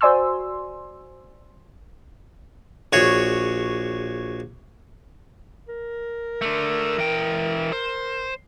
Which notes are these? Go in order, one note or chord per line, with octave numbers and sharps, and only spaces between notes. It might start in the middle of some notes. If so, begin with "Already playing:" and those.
F#4 C5 D5 G#5 C6 E6
A#1 F#4 G#4 C#5
A#4
D3 A3
E3 G5
C5